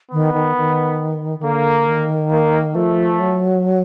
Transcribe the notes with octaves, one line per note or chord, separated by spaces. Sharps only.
D#3 B3
D#3
D#3
D#3
D3 A#3
D#3
A#3
F3 A3
F#3